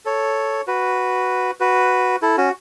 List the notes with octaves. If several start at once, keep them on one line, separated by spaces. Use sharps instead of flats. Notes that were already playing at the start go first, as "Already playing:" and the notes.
A4 C#5
F#4 B4
F#4 B4
E4 A4
C#4 F#4